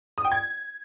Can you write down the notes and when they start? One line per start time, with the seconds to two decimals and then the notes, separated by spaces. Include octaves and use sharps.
0.18 D#6
0.25 G5
0.32 G#6